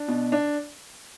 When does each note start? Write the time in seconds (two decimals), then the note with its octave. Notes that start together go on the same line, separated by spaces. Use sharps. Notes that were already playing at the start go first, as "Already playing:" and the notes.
Already playing: D4
0.08 B2
0.32 D4